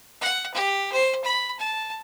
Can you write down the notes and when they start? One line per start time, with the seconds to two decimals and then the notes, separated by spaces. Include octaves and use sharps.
0.21 F#5
0.54 G4
0.92 C5
1.24 B5
1.60 A5